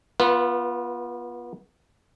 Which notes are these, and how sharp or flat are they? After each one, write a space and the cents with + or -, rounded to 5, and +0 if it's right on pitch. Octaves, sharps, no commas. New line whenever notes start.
B3 -30 F4 +0 B4 +0